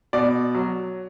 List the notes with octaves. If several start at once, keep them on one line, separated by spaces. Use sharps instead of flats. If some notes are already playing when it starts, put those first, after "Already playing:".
B2 D5
F#3